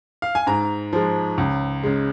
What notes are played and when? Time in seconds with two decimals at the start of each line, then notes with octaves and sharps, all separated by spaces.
0.22 F5
0.35 G#5
0.47 G#2 A#5
0.93 F3 G#3
1.38 C#2
1.83 C#3 G#3